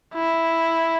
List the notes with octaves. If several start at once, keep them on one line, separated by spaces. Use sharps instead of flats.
E4